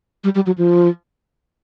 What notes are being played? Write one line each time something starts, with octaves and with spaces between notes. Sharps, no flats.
G3
G3
F#3
F3